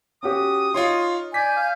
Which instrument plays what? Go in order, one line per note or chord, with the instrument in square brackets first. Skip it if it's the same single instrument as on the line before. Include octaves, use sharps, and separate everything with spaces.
[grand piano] C#4 F#4 G4 [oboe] D#6
[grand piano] D#4 [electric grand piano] F4 C#5 C6
[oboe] D5 [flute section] G#5 G6 G#6 [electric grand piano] B6
[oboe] F5